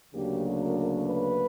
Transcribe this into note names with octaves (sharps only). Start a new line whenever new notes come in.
D2 C#3 F#3 A#3 D4 G4
A#4
B4